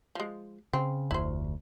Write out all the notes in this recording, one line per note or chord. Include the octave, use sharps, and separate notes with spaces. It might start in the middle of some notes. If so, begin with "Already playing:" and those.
F3 G#3
C#3 C4
F1 D2 E4 C5